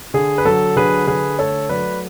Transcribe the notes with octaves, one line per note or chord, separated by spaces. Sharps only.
D3 G#4
B4
F#3 A4
D3 G#4 B4
D3 G#4 B4
A3 A4 C#5
F#3 B4 D5